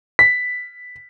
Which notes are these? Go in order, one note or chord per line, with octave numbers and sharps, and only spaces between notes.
B6